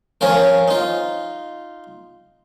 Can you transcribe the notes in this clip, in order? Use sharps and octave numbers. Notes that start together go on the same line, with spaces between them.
F3 C#4 F4 A#4
D#4 F4